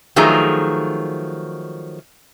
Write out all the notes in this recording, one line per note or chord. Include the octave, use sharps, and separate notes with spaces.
D#3 F3 F#3 A3 G#4 A#5